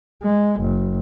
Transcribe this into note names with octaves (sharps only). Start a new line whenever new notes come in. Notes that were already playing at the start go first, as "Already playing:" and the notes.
G#3
F#1